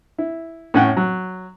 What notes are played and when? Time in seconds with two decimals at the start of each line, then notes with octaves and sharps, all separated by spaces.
0.18 E4
0.74 A2 C#4 F#5 G5
0.97 F#3